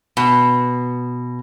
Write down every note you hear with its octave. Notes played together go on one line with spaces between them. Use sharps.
B2